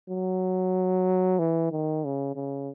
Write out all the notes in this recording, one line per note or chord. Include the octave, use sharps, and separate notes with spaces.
F#3
E3
D#3
C#3
C#3